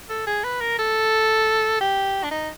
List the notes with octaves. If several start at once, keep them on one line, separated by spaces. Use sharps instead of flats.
A4
G#4
B4
A#4
A4
G4
D4
D#4